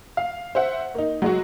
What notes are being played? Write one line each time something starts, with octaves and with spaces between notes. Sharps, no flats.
F5
C5 E5 F#5
A#3 D#4
F#3 G#3 F#4